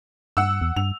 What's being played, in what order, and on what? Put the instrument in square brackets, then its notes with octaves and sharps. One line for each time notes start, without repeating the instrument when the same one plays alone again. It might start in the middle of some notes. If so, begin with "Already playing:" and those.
[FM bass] G2 [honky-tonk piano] F#5 E6
[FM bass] E2
[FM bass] G2 [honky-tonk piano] F7